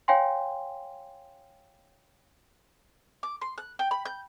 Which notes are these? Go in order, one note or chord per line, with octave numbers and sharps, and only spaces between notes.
C#5 F5 G5 G#5 C6
D6
C6
F#6
G5
B5
G6